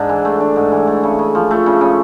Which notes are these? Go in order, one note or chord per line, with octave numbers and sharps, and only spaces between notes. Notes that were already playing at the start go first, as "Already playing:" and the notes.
Already playing: G#2 D4
E3
A3
D4
G#2
E3
A3
C#3
C#3
F3
A3
C#3
C#3